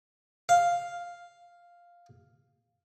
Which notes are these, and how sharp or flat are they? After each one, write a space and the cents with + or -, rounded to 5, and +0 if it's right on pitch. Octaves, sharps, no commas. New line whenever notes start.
F5 +0